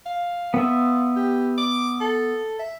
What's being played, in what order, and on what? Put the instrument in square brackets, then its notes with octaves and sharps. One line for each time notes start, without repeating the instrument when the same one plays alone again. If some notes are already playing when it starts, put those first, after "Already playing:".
[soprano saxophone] F5
[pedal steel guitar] B3 E5 [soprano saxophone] F4
[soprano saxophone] G4
D6
A4
E5